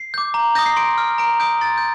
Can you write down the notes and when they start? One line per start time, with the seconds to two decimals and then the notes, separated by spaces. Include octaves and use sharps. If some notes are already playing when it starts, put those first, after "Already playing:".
Already playing: C7
0.14 D6 G6
0.34 A#5
0.55 D#6 G6 A#6
0.66 C7
0.76 C6 D7
0.98 F6
1.18 A#5 D7
1.40 D#6 G6 D7
1.61 C6 A6
1.77 G6